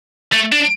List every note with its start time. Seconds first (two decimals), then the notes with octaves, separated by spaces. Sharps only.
0.33 A3
0.52 D4